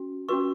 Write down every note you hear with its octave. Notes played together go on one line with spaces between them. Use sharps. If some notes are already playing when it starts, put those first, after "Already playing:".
Already playing: C#4 F#4
C#4 F#4 B4 C#6